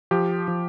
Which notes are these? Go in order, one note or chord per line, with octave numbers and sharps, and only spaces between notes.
F3 G4
F3